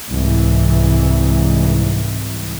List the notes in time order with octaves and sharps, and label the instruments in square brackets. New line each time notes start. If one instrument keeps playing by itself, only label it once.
[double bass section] C2 G#2 E3